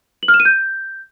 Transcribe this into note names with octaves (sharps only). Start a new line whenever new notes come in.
F#7
F6
E7
D#7
G6